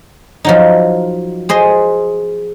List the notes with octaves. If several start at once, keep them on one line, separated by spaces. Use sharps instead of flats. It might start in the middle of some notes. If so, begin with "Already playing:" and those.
F3 F#3 D#4
G#4 C5 D#5